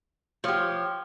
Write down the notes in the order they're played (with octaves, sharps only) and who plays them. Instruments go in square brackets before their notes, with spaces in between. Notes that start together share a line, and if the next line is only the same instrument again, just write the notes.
[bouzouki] F3 [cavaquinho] G4 C#5